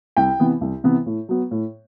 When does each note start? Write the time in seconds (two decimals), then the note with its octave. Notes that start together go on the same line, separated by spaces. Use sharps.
0.17 C2 G5
0.40 C3 E3 B3
0.61 C2
0.84 C3 E3 B3
1.06 A2
1.28 F#3 B3
1.51 A2